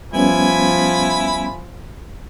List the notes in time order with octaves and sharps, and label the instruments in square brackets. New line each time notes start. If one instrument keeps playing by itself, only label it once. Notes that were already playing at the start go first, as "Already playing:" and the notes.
[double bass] F3 [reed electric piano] G3 B3 C#4 [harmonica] E4 G#5 B5